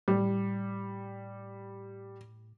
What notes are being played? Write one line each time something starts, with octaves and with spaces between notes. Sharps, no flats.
A2 G3